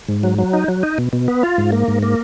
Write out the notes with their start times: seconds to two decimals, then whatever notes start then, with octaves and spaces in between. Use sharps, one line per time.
0.09 G#2
0.23 F#3
0.38 F#3
0.53 D#4
0.68 F#3
0.83 D#4
0.98 B2
1.13 B2
1.28 B3
1.43 F4
1.58 G#2
1.72 A#3
1.88 G#2
2.02 A#3